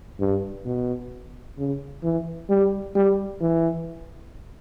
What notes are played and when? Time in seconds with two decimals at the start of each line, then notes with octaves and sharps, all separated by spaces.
0.20 G2
0.66 B2
1.58 C#3
2.04 E3
2.50 G3
2.95 G3
3.41 E3